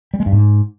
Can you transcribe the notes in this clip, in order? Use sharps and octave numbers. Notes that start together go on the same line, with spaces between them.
G3
G#3
G2
G#2